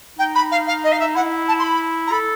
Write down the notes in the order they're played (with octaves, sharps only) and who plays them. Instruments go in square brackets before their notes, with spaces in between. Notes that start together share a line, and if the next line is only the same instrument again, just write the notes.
[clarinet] D#4 [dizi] G5
[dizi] B5
F5
F5
D#5
F5
E5
[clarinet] E4 [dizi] F#5
[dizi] A5
C6
B5
A#5
[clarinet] A4 [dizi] B5